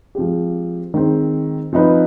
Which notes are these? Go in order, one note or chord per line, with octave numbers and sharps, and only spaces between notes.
F3 G#3 C4 G4
D#3 G#3 C4
F3 C4 D#4 B4